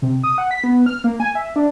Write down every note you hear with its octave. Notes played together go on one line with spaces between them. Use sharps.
C3
D#6
F#5
B6
B3
F6
A#3
G#5
E5
D4